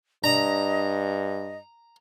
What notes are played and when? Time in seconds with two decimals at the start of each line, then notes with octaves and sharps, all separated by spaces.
0.24 G2 D4 D5 D#5 A#5 A#6